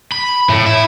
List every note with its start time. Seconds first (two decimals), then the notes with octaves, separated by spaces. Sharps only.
0.12 B5
0.49 A2
0.66 E4